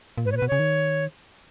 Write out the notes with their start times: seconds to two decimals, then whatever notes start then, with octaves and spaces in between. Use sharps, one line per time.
0.18 A#2
0.25 G#2 B4
0.32 A#2 C#5
0.37 B4
0.42 B2
0.48 C#3 C#5
0.59 D#3